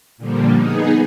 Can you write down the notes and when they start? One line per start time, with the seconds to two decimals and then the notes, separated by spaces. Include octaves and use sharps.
0.18 A#2 D3 F3 G3 A#3
0.57 B3 D#4 G#4